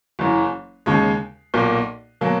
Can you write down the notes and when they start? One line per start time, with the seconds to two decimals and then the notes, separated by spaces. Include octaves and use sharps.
0.19 F#1 F#2 E3
0.86 D#2 C#3 G#3
1.54 B1 A#2 A#3
2.21 B2 F#3 A#3